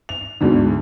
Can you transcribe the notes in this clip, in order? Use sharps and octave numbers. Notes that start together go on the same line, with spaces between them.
F7
D2 G#2 B2 D3